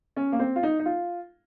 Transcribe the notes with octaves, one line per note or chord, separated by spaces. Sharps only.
C#4
A#3
C4
F4
D#4
D#4
F4